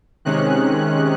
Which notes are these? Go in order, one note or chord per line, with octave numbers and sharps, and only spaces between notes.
C3 D#3 G#3 C#4 F#6